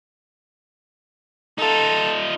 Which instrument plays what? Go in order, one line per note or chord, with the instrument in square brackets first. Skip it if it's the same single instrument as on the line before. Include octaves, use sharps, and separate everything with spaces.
[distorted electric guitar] D#4 F4 [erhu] A4